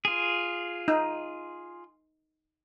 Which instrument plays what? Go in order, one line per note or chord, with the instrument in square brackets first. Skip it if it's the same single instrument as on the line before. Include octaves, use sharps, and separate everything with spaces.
[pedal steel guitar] F4 G#4
[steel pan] D#4